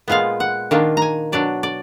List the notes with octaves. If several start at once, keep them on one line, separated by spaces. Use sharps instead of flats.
A#2 G#3 B3 F4 F5
F#5
D#3 A#3 D4 F4
G#5 A#5
B2 F#3 D4 D5
D5